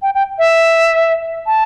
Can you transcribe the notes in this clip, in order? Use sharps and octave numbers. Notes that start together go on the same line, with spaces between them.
G5
G5
E5
A5